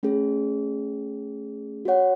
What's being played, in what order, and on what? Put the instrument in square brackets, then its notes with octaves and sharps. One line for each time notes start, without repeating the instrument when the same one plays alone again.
[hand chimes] A3 C#4 G#4
F#4 C#5 F#5